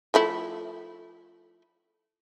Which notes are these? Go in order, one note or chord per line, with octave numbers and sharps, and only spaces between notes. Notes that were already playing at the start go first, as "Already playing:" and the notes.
F3 A3 E4